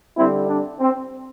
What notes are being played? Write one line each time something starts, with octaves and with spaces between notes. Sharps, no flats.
D3 G3 C4 E4
D4
C4